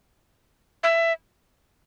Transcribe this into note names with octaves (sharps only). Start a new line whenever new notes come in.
E5